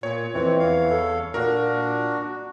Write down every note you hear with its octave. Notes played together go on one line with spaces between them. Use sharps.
A#2 C#5
F2 E3 C4
E2 F5
A4
A#2 D4 F#4 A#4